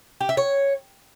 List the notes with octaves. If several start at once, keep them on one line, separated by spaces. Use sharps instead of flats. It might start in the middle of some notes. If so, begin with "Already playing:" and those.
G4
E5
C#5